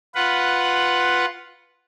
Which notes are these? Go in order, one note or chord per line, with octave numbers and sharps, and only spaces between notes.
F4 B4 F#5